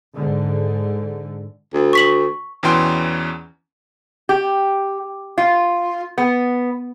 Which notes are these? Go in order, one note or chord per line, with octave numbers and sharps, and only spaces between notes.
G#2 D3
D2
C#6 B6 F#7
E2 B2 E3 C#4 G5 C6
G4
F4
B3